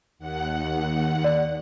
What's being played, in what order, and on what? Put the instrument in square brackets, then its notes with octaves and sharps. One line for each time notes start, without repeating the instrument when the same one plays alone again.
[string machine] D#2 F#5
[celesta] D5